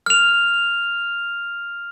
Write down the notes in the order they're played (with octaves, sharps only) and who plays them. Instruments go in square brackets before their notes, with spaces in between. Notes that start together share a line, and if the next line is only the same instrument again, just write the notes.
[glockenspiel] F6 F7